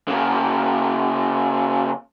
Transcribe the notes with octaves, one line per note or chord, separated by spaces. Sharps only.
C#3 A#3